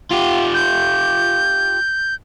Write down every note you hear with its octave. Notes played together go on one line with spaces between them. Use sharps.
F4 G4
G6